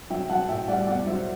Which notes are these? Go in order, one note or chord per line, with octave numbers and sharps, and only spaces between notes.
F#3 E5 G5
F#3 F#5 A5
A2 E5 G5
G3 D5 F#5
E2 D5 F#5
F#3 C5 E5